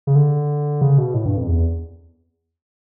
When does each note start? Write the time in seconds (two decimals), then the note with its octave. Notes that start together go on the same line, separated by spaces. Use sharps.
0.07 C#3
0.16 D3
0.81 C#3
0.98 B2
1.14 A2
1.25 G2
1.37 F2
1.47 E2